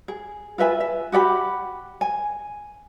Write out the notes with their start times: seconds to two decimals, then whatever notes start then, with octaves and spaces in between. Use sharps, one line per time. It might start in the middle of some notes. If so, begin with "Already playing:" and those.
0.08 G#4
0.58 F4 B4 E5 G#5
0.80 E5
1.12 F#4 G4 F#5 B5
2.01 G#5